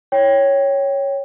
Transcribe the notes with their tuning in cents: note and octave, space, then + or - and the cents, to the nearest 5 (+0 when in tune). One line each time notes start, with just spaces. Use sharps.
C#5 +0 G5 +0